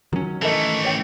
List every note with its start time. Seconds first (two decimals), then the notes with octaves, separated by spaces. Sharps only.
0.13 D#3 F#3 C#4
0.42 E3 A3 A4 A#4 D#5
0.84 C#5 G5